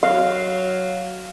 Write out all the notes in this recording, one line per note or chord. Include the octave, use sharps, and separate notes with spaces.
F#3 F5